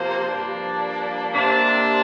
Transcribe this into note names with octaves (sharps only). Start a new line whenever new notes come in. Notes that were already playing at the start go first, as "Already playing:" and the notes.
Already playing: C3 F3 A#3 C5
G2 F3 A#3 D4
C3 A#3 D4